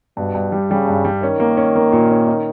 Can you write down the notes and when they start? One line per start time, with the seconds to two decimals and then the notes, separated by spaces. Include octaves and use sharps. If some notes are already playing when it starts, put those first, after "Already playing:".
0.17 G2 B2
0.35 G2
0.52 G3
0.70 C#3 G3
0.88 G2
1.05 G3
1.23 D#3 C#4
1.40 A#3
1.57 C#4
1.76 A#3
1.92 A#2
2.10 C#4
2.28 D#4